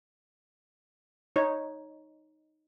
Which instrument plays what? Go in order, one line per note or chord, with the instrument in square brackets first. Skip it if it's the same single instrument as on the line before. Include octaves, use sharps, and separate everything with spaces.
[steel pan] D#4 C#5